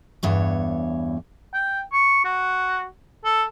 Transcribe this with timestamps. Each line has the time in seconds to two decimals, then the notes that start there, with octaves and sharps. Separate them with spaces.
0.23 E2 G2 C#5
1.54 G5
1.93 C#6
2.24 F#4
3.25 A4